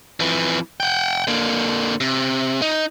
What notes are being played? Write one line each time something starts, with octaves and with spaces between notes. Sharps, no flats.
F2 E3
F#5 G5
D3 A#3
C3
D#4